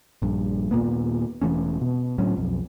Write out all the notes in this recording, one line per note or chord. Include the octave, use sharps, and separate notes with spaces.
A#1 G2
D#2 A#2 A#3 B3
E1 E3 A3 C#4
B2
D2 A2 F#3 C#4
B1 F2